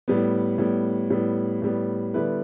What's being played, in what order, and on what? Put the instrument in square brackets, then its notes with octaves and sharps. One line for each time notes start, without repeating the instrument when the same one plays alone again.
[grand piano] A2 G3 B3
A2 G3 B3
A2 G3 B3
A2 G3 B3
D3 G3 B3 E4 B4